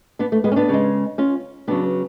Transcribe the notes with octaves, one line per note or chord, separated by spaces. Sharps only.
B3 D4
A3
G#3 B3
C#4
B3 D4
C#3 G#3
C#4 F4
C#3 F#3 B3 D4